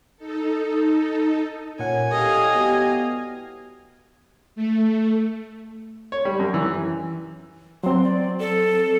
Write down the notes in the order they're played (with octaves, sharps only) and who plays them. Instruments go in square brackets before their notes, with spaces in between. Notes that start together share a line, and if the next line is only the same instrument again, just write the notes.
[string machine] D#4 A4
[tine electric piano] A#2 A#4 F#5 [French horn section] C#4 [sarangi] G#5
[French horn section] A2 G3 G4 [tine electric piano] A4 [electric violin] D#5 F5
[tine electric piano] B3 F#4
[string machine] A3
[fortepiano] C#5
G3
F#2
E3
[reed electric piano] F#3 C4 [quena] C6
[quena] D5
A4